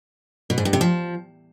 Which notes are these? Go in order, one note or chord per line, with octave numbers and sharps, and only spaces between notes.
B2
G#2
G2
C3
F3